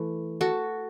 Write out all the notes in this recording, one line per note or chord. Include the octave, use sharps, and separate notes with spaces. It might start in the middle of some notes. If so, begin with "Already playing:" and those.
Already playing: E3 A3
F#4 A4